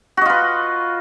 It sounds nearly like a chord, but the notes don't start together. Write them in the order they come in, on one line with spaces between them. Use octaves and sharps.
F#4 D#5 F4 B4